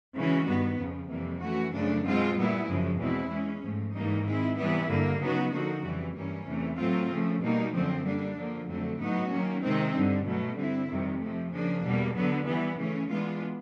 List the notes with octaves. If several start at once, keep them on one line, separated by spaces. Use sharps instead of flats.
C#3 E3 G#3 C#4 F#4
G2 D#3 G3 B3
F2 C#3 F3
F2 C3 E3 G3 A#3
E3 A3 C#4 F#4
F#2 C#3 F3 A3 D4
B2 G#3 C4 F4
A#2 G3 B3 E4
F#2 C#3 F3 G#3
E2 B2 G#3 C4 E4
E3 G#3 C#4
G#2 F3 A3
G#2 E3 G3 A#3 D#4
D#3 G#3 C4 E4
C3 E3 G3 B3 E4
G2 D3 G3 A#3
C#3 F#3 B3 D#4 F#4
D3 F3 A#3 D#4 F#4
F2 C#3 E3 G3
G2 E3 G3 A#3 C#4
E2 C3 E3 A3
A2 F#3 A3 C4 F4
C#3 F3 A3
B2 G3 A#3 D#4
F#2 D3 F3 A3 C4
D3 G3 A#3 D4
D3 F3 A#3
F2 D3 F#3 A3 C4
A2 F#3 B3 D#4 F#4
D#3 F#3 A#3 C#4
C3 D#3 G#3 C4 D#4
G2 D3 G3
B2 F#3 A3
D3 G3 C4 E4
F2 C3 D#3 G3
C3 F3 A3
C#3 F3 A#3 D4
E2 B2 G3 A#3
D3 F#3 B3
E3 G3 B3
C#3 E3 A3 C#4
E3 G#3 B3 D4 F4